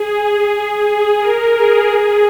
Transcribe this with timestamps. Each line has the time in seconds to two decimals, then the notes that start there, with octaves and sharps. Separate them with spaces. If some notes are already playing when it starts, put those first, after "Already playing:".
Already playing: G#4
0.24 G#4
0.88 G#4
1.20 A#4
1.52 G#4
1.83 G#4